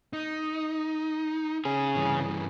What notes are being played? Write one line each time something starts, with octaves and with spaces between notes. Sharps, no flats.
D#4
C#3 G#4
G2 E3